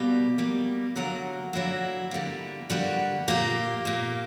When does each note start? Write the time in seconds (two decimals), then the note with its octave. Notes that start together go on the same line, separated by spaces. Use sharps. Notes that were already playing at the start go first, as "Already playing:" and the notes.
Already playing: B2 G3 A#3 G4
0.38 B2 G3 A#3
0.96 D3 F#3 A#3 A#4
1.53 D3 F#3 A#3 E4
2.11 D3 G3 A#3
2.70 D3 G3 A#3 F#4
3.28 A#2 A#3 G4
3.85 A#2 A#3